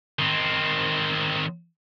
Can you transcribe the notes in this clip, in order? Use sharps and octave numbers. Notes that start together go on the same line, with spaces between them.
D#3 C4